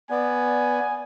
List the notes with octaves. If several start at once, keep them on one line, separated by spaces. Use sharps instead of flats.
B3 D5 G#5